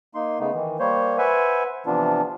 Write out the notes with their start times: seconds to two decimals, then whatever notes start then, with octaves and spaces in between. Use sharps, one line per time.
0.15 A#3 D#4 C6
0.39 C#3 A3 B3 D#4
0.54 D#3 E3
0.79 G3 A#3 C5 C#5
1.18 B4 C5 E5 F#5 G#5
1.86 C3 E3 F3 B3 D4 F4